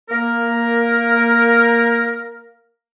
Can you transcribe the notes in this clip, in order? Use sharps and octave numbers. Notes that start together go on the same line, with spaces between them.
A#3 A#4